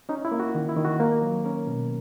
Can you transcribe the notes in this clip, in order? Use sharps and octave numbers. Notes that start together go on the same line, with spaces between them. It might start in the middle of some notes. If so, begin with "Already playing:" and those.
C#4 D#4
E4
A#3
F#4
D#3
E4
D#3
F#4
A#3
F#3
C#4 A#4
B2